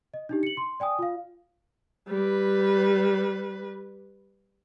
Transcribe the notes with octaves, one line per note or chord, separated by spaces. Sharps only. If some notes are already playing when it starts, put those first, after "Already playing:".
D#5
D4 D#4 G4
C#7 F#7
C6
D5 G5 G#5 D#6
F4 F5
G3 B4